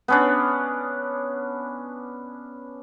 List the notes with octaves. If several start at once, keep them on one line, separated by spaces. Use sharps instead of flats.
B3 C#4 D4